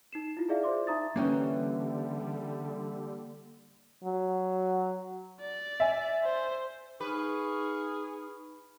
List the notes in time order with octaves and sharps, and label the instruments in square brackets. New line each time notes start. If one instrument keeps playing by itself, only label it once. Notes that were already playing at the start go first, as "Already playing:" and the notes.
[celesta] D#4 C7 E7
E4 F4
E4 G#4 D5 E5 F5
C5 D5 E5 C6 D6
D#4 E5 A#5 D#6 A6
[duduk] D3 [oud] E3 C#4 [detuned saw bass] G3 [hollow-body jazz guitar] A#3 G5
[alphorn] F#3
[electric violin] D5
[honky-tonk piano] E5 G#5
[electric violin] C5
[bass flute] D#4 [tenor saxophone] G#4 [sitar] B4 [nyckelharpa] F5 C#6